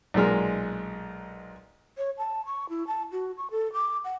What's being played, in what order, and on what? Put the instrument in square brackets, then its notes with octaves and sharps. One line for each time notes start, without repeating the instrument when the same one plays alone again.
[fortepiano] B1 A#2 G#3 A#4
[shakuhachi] C#5
A5
C#6
E4
A5
F#4
C#6
A4
D6
F#5